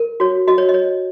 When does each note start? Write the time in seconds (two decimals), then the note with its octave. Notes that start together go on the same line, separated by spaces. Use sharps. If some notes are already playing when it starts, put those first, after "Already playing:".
Already playing: A#4
0.20 F#4 C#5
0.47 F#4 D#5
0.58 C#5
0.69 D#5
0.74 C#5